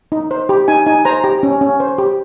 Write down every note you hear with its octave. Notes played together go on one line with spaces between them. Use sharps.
D#4
C5
G4
D#4 G#5
D#4 G#5
C5 A#5
G4 G5
C#4
C#4
C5
G4